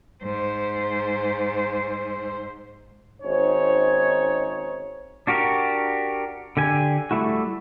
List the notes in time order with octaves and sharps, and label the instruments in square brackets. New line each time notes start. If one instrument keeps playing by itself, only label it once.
[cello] G#2 C5
[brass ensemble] G#1 C#4 D#4 C5 C#5
[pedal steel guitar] D4 F#4 G4 A#4
D3 G4 G#5
G3 A3 E4 F#4